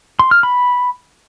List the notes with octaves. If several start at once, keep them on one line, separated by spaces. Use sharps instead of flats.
C6
F6
B5